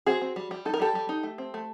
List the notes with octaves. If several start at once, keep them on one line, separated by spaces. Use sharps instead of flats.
C4 F#4 G#4
C4
G3
G3
D#4 A4
A#4
G3 G4 A4
G3
D#4
A3
C4
A3